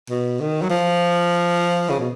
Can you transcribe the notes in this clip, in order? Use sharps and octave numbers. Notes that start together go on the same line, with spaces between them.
B2
D#3
F#3
F3
C#3
B2